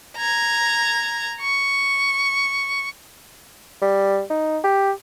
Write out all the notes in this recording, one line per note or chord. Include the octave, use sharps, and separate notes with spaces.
A#5 G#6
C#6
G3
D#4
G4